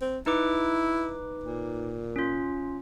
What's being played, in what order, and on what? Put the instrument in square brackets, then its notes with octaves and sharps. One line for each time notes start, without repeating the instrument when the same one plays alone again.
[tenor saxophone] C4
[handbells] D#4 B4 D6 [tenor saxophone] E4
[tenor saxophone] A#2
[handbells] C#4 F4